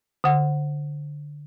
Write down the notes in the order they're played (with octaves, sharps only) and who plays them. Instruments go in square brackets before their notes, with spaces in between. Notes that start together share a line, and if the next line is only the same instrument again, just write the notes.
[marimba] D3 F#5